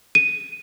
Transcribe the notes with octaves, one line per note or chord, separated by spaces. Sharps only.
D#7